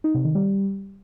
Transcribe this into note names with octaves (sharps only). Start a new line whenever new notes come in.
D#4
C3
D#3
G3